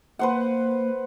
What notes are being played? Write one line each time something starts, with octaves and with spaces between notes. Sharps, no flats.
A#3 B4 C5 F#5